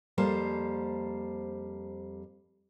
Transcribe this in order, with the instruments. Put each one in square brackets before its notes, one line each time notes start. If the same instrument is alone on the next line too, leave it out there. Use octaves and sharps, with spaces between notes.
[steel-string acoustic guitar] F2 G3 A#3 C5 A5